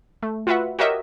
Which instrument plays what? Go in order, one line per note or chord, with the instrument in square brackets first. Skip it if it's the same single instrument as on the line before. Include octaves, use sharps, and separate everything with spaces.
[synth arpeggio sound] A3
F4 F#4 B4 E5 F#5
F#4 G4 A#4 C#5 D#5 E5